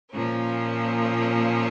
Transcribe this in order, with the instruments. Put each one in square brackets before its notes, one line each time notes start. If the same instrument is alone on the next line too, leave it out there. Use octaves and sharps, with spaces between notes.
[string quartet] A#2 F3 A#3 C#4